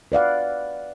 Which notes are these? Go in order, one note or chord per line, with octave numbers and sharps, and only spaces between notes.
B4 D5 F5 F#5